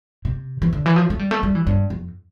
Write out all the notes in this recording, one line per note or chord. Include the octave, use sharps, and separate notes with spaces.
C3
E3
D3
E3
F3
A3
G3
A3
G3
E3
G2
F2